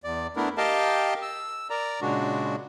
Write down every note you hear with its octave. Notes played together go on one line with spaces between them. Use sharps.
E2 D5
A3 B3 D4 E4 A#4
G4 A#4 D#5 F5 G5 A5
E6
A#4 D5 A#5
A#2 C#3 G#3 D4 F#4